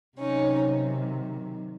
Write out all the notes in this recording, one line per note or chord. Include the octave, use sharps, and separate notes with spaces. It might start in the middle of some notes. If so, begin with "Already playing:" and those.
C3 D#3 F#3 C#4 D#4